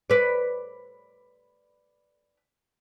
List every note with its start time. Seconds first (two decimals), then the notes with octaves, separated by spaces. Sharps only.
0.10 B4 D5